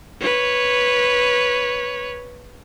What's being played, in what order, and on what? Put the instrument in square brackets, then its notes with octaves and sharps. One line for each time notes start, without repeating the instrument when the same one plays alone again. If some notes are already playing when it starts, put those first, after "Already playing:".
[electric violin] B4 C#5